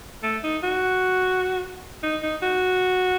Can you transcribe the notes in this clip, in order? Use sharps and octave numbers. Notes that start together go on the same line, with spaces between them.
A3
D#4
F#4
D#4
D#4
F#4